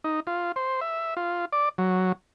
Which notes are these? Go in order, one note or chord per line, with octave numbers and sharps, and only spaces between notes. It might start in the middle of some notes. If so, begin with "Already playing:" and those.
D#4
F4
C5
E5
F4
D5
F#3